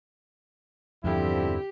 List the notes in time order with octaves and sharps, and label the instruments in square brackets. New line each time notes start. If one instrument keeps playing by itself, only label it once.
[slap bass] E2 G2 [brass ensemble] D3 C4 E4 [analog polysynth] F3 [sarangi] G4